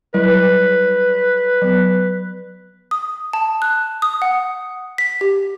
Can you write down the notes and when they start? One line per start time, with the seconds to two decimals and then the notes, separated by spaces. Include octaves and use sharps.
0.14 F#3 G3 E4 B4
1.62 F#3 B3
2.91 D#6
3.33 A5
3.62 F#6
4.02 D#6
4.22 F#5
4.98 B6
5.21 G4